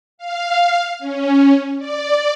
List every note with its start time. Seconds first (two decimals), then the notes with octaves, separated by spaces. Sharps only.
0.18 F5
0.99 C#4
1.78 D5